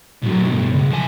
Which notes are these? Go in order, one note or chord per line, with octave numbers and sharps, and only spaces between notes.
A2 F#3
G2 B2
C#2
F3 G#5